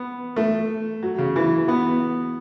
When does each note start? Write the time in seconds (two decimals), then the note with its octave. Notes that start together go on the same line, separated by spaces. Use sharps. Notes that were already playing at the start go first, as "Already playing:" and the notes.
Already playing: B3
0.36 A3
1.03 F#3
1.18 C#3
1.36 E3
1.68 B3